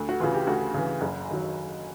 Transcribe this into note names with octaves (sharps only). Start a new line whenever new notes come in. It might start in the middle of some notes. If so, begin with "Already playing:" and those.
Already playing: D2
F#4
C#3 E3 F4
G4
D2 F#4
C#3 E3
F#1
D#3 F#3